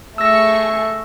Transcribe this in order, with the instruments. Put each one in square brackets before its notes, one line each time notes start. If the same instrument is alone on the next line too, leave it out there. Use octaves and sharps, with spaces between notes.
[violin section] A3 G#4 C#6 [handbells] E6 A#6